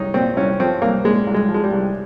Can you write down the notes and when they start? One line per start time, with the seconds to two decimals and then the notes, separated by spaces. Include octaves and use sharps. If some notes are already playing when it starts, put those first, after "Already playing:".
Already playing: C2 C#4 D#4
0.14 A#2 C4
0.36 C2 C#4
0.60 F3 C4
0.82 C2 A#3
1.05 A#2 G#3
1.27 C2
1.34 G#3
1.49 F3
1.54 G#3
1.64 G3
1.72 C2